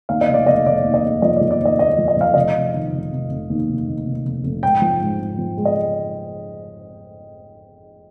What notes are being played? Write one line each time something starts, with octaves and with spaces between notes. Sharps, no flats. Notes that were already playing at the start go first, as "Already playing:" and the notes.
D#2 F5
D#5
F1
D5
F1 D#5
F1 D5
D#2
D#5
F1
F3 D#5
D5
F3
D5
D#2
D#5
D#2 D#5
F3
D#5
F3 F5
F1 D#5
F1
D#3
F1
F1
F1
D#2
F1
D#2
F1
F1
F1
G#2 G5
F3
G#2
G#2
F3
G#3
D#5